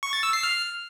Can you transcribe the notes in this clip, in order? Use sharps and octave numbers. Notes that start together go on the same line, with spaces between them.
C#6
A6
E6
C7
F6